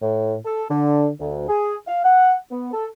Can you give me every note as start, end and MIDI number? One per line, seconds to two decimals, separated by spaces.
0.01 0.35 45
0.45 0.64 69
0.70 1.08 50
1.20 1.46 38
1.48 1.76 68
1.86 2.02 77
2.03 2.36 78
2.50 2.69 59
2.72 2.86 69